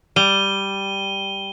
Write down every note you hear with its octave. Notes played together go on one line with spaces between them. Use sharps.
G3 D#7 G7